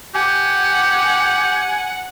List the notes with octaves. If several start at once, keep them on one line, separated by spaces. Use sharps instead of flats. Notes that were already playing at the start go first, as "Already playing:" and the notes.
G4 F#5 G#5